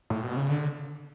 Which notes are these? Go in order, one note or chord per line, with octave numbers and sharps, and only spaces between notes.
A2
B2
C#3
D3